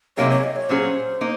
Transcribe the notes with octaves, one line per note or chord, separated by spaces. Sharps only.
C3 F#3 A#3 D#4 G#4 C#5
C#5
D#5
C#5
A#2 F#3 C#4 G#4 C5
A#3 D#4